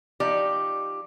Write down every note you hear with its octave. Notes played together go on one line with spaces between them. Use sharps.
F3 D#4 G4 D5